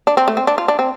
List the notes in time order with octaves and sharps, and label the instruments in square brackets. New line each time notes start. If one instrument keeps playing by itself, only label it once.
[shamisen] D4
C4
A3
C4
D4
F4
D4
C4